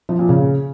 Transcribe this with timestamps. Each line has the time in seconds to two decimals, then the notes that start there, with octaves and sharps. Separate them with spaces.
0.09 F3
0.19 A#2
0.29 C#3